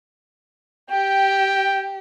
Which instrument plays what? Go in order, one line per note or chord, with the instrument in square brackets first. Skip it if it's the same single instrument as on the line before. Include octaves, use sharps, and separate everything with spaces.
[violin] G4 [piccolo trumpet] G5